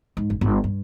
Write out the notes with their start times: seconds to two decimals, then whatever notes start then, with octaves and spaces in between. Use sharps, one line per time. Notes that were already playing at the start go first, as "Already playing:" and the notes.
0.17 G#2
0.30 F#1
0.41 G1
0.64 G2